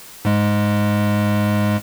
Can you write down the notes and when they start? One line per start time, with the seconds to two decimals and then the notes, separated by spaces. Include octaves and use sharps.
0.25 G#2 G#3